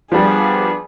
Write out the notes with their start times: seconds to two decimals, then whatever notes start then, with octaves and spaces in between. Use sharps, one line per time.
0.12 F3 G3 B3 D4 G#4